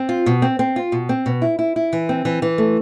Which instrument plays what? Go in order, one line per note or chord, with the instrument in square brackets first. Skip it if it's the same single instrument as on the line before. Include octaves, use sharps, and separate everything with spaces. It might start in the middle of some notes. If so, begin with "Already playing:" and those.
Already playing: [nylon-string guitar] C4
F4
B2
C4
C4
F4
B2
C4
B2
E4
E4
E4
E3
C4
E3
E3
A3